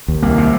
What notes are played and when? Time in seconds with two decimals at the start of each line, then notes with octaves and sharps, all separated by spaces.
0.08 D#2
0.22 C2 A#3
0.38 C3